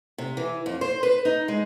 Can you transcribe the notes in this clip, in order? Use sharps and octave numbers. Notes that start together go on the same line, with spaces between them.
C3
E3
F2
C5
B4
D#4
G#3